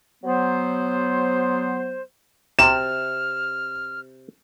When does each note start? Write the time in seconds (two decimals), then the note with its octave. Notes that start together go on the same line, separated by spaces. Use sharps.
0.24 F#3 B3 C5
2.59 C3 F6 E7